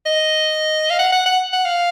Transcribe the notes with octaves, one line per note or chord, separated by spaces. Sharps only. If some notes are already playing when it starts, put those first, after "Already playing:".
D#5
F5
F#5
F#5
F#5
F#5
F5